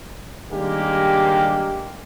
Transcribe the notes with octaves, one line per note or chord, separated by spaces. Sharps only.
D#3 G3 G#3 A#3 D4 G4